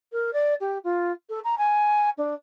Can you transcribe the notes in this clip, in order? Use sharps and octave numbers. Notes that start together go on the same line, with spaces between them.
A#4
D5
G4
F4
A4
A#5
G#5
D4